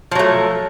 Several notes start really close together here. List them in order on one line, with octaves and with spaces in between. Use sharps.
F3 F#3 A3